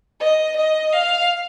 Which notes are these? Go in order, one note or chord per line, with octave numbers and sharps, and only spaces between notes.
D#5
D#5
F5